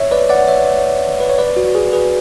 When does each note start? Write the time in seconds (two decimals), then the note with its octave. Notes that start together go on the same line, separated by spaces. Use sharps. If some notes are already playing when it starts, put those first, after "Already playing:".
Already playing: C#5 E5
0.11 B4 D5
0.29 D5 F#5
0.48 C#5 E5
1.20 B4
1.29 C#5
1.38 B4 D5
1.57 F#4
1.75 G#4
1.93 G#4 B4